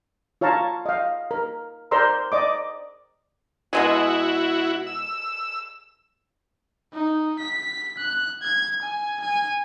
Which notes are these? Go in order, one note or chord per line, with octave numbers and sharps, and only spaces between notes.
F4 C#5 F5 A5 A#5
D#5 F5
A#4
A#4 C5 D5 A#5 C6 E6
D5 D#5 D6
B2 G#3 E4 F#4 G#4
E6
D#4
B6
F#6
G#6
G#5
G#5